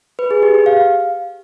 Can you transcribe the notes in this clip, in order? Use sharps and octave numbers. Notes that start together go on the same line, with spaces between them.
B4
G#4
G4
G4
F5